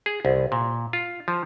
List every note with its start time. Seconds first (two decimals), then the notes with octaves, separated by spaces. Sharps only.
0.06 G#4
0.25 C2
0.52 A#2
0.93 F4
1.28 F3